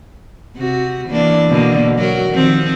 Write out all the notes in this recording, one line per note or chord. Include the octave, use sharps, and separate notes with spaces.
C3 F#4
E3 A#3 D4
B2 D3 A#3
F#3 F#4 A#4
D#3 F3 C4